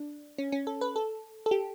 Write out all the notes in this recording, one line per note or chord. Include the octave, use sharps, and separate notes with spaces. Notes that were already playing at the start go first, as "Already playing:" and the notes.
Already playing: D4
C#4
C#4
A4
B4
A4
A4
G4